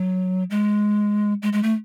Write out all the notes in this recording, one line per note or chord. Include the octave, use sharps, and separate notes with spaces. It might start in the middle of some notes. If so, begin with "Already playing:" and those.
Already playing: F#3
G#3
G#3
G#3
A3